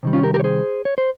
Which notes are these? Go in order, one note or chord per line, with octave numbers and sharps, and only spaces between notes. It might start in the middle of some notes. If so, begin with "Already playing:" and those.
C3 D#3 G3
C#4 F4
G4 A#4
G4 A#4
C#5
G#4 C5
C#5
C5